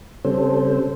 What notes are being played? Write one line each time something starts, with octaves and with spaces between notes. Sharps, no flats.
C#3 G3 C4 C#4 A4 C5